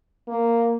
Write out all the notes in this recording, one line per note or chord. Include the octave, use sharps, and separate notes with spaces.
A#3